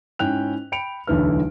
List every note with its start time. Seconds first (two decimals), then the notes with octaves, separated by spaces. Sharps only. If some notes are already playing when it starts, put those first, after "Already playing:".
0.19 G#2 C#4 E4 G5 F#6 F7
0.72 G5 B5 C#7 D7 F7
1.07 D1 B1 E2 D3 B4 F6